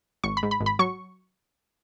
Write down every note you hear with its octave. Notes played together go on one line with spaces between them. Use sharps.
G#1 C#6
B5
G#2
B5
G#1
B5
F#3 C#6